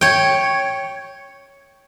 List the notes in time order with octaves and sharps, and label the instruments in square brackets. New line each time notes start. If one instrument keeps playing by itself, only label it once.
[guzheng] C#5 G5